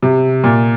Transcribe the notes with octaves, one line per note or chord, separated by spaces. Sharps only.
C3
A#2